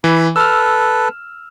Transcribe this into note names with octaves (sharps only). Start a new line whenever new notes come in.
E3 B5
A4 B4 E6 F6